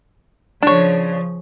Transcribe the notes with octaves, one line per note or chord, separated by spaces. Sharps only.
C#3 F3 D4 C#5